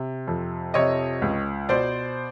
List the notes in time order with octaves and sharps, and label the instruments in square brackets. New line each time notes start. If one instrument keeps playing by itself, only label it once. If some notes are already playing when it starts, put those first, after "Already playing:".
Already playing: [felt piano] C3
F2
C3 C#5 D#5
C#2
B2 C5 D5